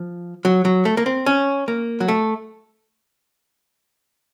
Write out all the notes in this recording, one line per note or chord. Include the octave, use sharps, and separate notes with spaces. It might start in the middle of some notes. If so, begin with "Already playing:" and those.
Already playing: F3
F#3
F#3
A3
A#3
C4
C#4
A#3
F#3
A3